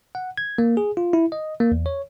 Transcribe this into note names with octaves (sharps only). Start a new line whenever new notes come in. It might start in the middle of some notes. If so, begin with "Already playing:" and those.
F#5
G#6
A#3
G#4
F4
E4
D#5
A#3
E2
C#5